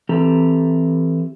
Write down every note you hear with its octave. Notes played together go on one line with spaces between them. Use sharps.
E3 C4 G4 A4 A#5